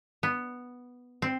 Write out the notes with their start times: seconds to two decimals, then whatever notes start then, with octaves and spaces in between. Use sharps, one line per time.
0.23 B3
1.22 C4